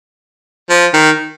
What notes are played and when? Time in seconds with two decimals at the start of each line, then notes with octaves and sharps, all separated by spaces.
0.70 F3
0.93 D#3